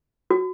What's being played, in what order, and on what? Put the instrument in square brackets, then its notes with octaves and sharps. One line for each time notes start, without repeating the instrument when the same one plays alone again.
[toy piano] F#4